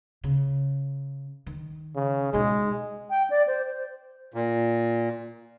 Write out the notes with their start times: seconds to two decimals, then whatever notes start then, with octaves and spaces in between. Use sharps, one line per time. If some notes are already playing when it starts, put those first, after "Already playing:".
0.24 C#3
1.47 D#3
1.95 C#3
2.33 B2 G#3 D#4
3.10 G5
3.30 D5
3.47 C5
3.66 C5
4.34 A#2